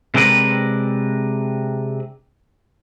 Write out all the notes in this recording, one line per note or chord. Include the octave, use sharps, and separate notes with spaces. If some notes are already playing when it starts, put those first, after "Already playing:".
C3 G#3 C4 D4 A#4 B4